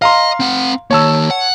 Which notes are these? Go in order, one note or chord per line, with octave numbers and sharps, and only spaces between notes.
D#5 F5 A#5 C6
C4 F#5
D#3 A#3 C#5 A5 E6
F#5